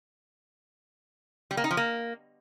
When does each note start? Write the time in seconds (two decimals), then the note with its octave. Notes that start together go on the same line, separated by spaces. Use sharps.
1.51 G3
1.57 A#3
1.64 D#4
1.71 F3
1.77 A#3